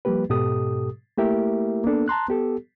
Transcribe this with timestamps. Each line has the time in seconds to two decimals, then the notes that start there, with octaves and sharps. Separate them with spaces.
0.05 F3 G3 A#3 G4 B4
0.30 G#2 B2 G4 A4 D#6
1.18 A3 A#3 E4 G4 A#4 E5
1.84 A#3 B3 D4 A4
2.08 A5 A#5 C6 F#6
2.28 B3 G4 A4